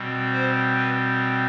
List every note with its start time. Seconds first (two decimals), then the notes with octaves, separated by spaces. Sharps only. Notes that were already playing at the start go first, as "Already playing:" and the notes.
Already playing: B2 G3 C4
0.31 C5
0.77 B4